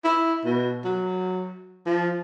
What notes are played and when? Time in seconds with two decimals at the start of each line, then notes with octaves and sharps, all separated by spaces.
0.04 E4
0.45 B2
0.85 F#3
1.86 F3